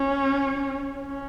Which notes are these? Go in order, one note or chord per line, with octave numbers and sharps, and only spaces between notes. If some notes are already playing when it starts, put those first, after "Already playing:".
Already playing: C#4
C#4